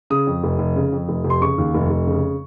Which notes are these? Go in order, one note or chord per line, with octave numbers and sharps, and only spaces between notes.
C#3 D#6
F2
F1
F1
C#3
F2
F1
F1
C6
C#3 C#6
D#2
F1
F1
C#3